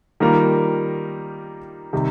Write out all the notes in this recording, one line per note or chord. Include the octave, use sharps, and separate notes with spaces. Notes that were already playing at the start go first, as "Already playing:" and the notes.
D#3 G3 A#3 F4 A#4
C3 D#3 G3